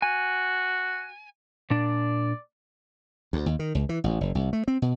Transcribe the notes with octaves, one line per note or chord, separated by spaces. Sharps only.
F#4 G#5
A#2 D4 D5
D2
D#2
D#3
C#2
E3
A1
F#1
C2
A3
C4
B2